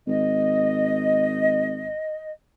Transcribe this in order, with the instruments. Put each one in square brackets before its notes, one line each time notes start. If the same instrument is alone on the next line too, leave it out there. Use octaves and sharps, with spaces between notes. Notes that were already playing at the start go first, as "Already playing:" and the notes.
[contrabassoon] G#1 [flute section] D#5